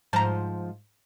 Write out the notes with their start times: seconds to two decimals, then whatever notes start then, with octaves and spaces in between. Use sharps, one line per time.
0.13 G#2 F3 C5 A5 A#5